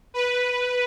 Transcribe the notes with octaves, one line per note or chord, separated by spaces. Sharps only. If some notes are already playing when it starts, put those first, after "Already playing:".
B4